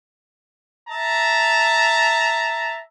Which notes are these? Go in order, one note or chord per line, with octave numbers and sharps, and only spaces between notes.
E5 A5 A#5